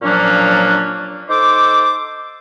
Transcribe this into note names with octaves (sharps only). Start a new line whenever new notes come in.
A#2 F3 F#3 A#3 C#4 D4
D#4 A4 C5 D6